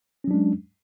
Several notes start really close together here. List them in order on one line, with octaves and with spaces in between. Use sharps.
C#4 F#3 D4 G#3